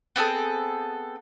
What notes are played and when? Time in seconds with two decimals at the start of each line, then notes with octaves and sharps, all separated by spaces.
0.16 B3 C4 G#4 A4